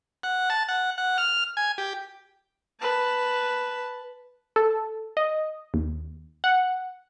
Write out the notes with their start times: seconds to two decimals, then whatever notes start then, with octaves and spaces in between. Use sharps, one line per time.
0.23 F#5
0.50 A5
0.68 F#5
0.98 F#5
1.18 F6
1.57 G#5
1.78 G4
2.80 B4 A5
4.56 A4
5.17 D#5
5.74 D#2
6.44 F#5